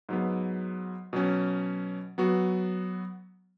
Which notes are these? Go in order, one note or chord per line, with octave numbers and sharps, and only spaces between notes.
G#2 F#3 B3
B2 F#3 C#4
F#3 B3 F#4